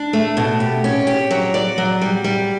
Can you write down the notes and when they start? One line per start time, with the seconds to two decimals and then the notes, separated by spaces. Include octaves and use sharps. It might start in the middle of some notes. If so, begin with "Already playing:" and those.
Already playing: D4
0.13 A3
0.37 B2
0.60 G4
0.84 C#4
1.07 G4
1.31 F#3
1.54 D5
1.78 F#3
2.01 G3
2.24 G3